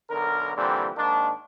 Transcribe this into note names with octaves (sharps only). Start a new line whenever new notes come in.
B1 D3 A#4
A#2 D3 E3 G3 C4
G#2 D#3 A#3 D4